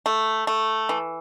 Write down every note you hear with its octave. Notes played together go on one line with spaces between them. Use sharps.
A3
A3
E3